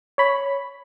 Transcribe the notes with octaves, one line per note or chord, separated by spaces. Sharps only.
C#5 B5